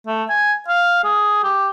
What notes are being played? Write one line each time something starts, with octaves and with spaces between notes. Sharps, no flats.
A3
G#5
F5
G#4
G4